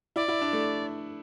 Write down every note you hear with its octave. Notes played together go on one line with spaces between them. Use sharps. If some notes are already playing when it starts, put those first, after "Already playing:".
E4 D5
E4
D4
A3